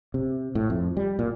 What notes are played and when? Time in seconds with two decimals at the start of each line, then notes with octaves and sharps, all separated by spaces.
0.14 C3
0.55 A2
0.70 F2
0.97 G3
1.19 A#2